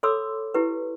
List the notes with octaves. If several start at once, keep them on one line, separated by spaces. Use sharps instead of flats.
A4 C#5 B5 C6 D6 E6
E4 G4 B4